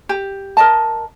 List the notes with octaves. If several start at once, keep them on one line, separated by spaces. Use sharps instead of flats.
G4
A#4 D#5 A5